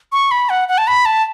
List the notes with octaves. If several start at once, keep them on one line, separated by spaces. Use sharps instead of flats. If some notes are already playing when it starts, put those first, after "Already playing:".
C#6
B5
F#5
F#5
A5
B5
A5